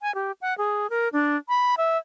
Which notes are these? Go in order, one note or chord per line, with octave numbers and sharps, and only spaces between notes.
G#5
G4
F#5
G#4
A#4
D4
B5
E5